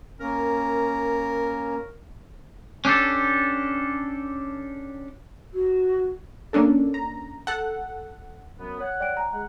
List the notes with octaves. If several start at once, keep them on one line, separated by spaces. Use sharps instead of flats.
A#3 C#4 A#4
C#4 D4 G4 A4
F#4
A#3 C#4 D4 A4
A#5
A4 F#5
F#2 F#3 B3
C#5 F#5
D5 G5 D7
G#5 A#5
G#3 F#5